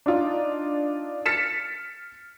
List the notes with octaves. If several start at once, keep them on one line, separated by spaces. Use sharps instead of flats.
D4 D#4 F4
F6 A6 B6 C#7 E7